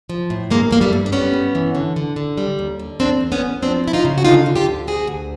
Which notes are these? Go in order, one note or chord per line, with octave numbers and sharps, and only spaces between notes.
F3
A2
G2 G#3 A#3
G2 A#3
G3 A3
G2
D4
G3 B3 C#4
G2
E3
D3
D3
D3
G3
D#2
D3
E2 C4 D4
E2
B3 C#4
E2
F3 C4 D4
E2 E4
D#4 F4
C#3
F#4
D3 D#4 F4
D3
F4 G4
D2
D2 F#4 G#4
D2